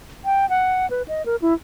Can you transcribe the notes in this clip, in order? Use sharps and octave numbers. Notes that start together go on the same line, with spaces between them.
G5
F#5
B4
D#5
A#4
E4